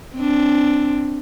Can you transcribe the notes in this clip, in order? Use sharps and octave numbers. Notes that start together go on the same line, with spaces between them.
C4 D4